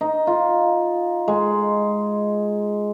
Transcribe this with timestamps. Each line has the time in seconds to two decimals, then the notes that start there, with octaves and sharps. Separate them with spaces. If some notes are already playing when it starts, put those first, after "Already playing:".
0.01 D#4
0.27 F4
1.28 G#3